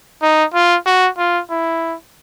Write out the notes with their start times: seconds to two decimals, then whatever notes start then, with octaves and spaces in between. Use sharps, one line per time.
0.22 D#4
0.54 F4
0.86 F#4
1.18 F4
1.50 E4